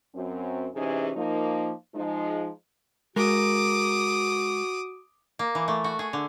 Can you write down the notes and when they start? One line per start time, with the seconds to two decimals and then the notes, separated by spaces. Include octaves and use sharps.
0.15 F#2 C4
0.74 C3 E3 C#4 D#4 G#4
1.16 F3 A#3 D#4
1.95 F3 G#3 D#4
3.16 G#3 F#4 A#4 D6 D#6
5.39 A#3
5.55 E3
5.68 A3
5.84 F#4
5.99 G#4
6.13 D3